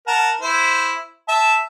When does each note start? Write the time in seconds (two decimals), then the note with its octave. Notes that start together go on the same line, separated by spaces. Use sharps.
0.07 A#4 F#5 A5
0.41 E4 C5
1.28 E5 A5